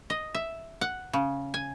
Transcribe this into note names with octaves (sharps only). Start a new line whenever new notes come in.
D#5
E5
F#5
C#3
G#5